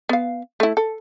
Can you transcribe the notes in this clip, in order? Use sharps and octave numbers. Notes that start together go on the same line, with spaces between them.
B3 F5
A3 E4
A4